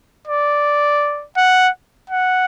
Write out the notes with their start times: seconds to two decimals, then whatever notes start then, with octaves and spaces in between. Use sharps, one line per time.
0.27 D5
1.37 F#5
2.10 F#5